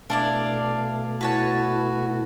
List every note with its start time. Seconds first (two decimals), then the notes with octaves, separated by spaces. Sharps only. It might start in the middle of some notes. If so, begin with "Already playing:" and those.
0.10 B2 A3 D4 E4 D5 F5
1.21 E4 F#4 B4 C#5 A5